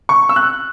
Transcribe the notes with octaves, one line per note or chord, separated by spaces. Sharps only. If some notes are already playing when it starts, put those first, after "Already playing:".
C#6
E6
F#6